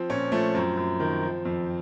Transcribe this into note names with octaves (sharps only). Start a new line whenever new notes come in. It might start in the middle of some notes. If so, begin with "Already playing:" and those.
Already playing: F3 C4
A#2 C#4
F3 A3
F#2 C4
F#2
D#3
F3
F2